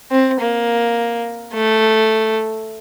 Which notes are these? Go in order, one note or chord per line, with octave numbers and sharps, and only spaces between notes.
C4
A#3
A3